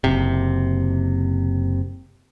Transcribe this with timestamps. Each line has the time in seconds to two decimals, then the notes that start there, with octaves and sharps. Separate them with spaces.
0.04 F#1 C3